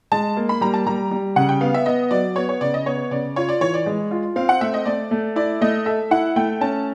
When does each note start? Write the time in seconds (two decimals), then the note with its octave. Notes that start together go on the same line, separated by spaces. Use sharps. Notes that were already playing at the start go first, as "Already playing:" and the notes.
0.12 G#3 A5
0.37 A#3
0.49 B5
0.61 G3 A#5
0.74 A5
0.87 G3 A#5
1.11 G3
1.36 C#3 F#5
1.49 G5
1.61 B3 F5
1.74 E5
1.86 B3 D#5
2.11 F#3 D5
2.36 B3 C#5
2.49 C#5
2.61 C#3 D5
2.74 D#5
2.86 B3 C#5
3.11 C#3 D5
3.36 F4 C#5
3.49 D5
3.61 E3 C#5
3.74 D5
3.86 G#3
4.11 F4
4.36 C4 F5
4.49 F#5
4.61 A3 E5
4.74 D#5
4.86 A3 D5
5.11 A3
5.36 E4 D5
5.61 A3 D#5
5.86 A4 E5
6.11 E4 F#5
6.36 A3 G5
6.61 C#4 A5